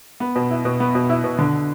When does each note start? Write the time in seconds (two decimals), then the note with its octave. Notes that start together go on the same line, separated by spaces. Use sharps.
0.20 B3
0.36 B2
0.50 E4
0.65 B2
0.80 B3
0.95 B2
1.09 E4
1.24 B2
1.39 D3